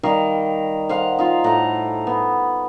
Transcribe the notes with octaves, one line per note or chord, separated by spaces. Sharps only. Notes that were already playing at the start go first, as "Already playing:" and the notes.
D#3 G3 D#5 F5
C5 F5 F#5
D#4 F4
A2 F#5 A#5
B3